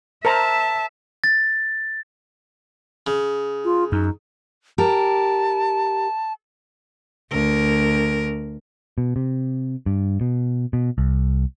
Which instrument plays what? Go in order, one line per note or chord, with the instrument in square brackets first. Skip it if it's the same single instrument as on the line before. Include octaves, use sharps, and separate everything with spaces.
[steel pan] A#4 C5 A#5 [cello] E5 [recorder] A5
[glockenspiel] A6
[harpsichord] C#3
[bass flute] F4
[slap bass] F#2 [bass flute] D#4
[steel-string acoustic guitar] G4 A#4 [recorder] A5
[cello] D2 A#4
[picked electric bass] B2
C3
G2
B2
B2
C2